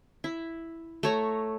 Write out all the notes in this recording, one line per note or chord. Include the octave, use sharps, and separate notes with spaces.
E4
A3 C#5 A#5